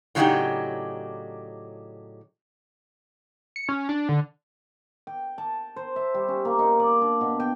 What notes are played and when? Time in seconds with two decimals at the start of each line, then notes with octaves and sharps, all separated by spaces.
0.15 A2 C#3 F#3 D4 D#4 G4
3.56 C#7
3.69 C#4
3.89 D4
4.09 D3
5.07 G5
5.38 A5
5.76 C5
5.96 E5
6.14 G3
6.28 C#4
6.45 A#3
6.59 D#4
6.80 D5
7.01 D4
7.21 B2
7.40 G5